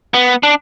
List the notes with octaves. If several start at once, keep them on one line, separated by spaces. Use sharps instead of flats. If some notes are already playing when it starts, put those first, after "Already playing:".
B3
D4